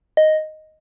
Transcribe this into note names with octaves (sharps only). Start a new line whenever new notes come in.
D#5